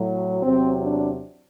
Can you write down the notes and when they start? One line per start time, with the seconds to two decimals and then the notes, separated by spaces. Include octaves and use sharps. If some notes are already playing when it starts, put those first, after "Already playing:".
Already playing: A2 F#3
0.43 E2 C3 F#3 C4
0.82 D4